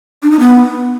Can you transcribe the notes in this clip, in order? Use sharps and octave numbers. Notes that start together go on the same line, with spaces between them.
D4
D#4
B3